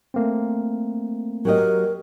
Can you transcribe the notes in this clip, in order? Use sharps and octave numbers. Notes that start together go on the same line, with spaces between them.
A3 A#3 C4
F#3 G4 A#4 D#5